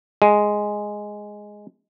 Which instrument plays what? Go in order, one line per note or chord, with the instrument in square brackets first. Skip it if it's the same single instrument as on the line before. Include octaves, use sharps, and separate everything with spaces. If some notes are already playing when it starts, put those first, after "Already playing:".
[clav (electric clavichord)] G#3